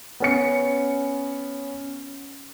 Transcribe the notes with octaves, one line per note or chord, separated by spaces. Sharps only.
B3 C#4 C#7